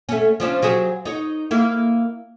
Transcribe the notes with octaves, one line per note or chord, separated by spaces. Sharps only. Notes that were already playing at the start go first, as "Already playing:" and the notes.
A3 C#4
F3 C#4 D4
F#3 G4 G#4
D#4 C#5
A#3 E4